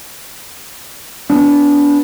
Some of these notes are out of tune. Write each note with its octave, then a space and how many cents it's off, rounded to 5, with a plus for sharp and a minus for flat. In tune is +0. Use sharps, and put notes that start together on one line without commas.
B3 +0 D4 -30